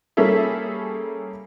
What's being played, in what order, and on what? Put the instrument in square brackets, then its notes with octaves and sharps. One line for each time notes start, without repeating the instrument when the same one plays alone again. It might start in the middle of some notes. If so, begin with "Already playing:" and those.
[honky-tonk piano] G3 A#3 C#4 G#4 A4 E5